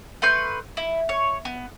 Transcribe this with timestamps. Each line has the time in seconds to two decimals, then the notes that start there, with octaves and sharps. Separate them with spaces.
0.22 A3 B4 C6 G6
0.77 E4
1.09 C#5
1.45 B3